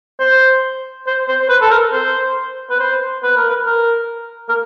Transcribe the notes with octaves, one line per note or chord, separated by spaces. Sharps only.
C5
C5
C5
C5
B4
A4
A#4
C5
B4
C5
B4
A#4
B4
A#4
A#4